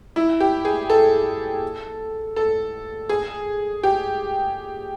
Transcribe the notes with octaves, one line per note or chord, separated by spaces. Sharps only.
E4
G4
G#4
A4
A4
G#4
G4